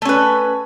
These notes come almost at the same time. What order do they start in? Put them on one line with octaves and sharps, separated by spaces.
A3 C#4 B4